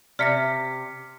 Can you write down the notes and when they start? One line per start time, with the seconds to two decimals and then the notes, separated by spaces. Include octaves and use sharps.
0.19 C3 D5 E5 F6 A#6 B6 C#7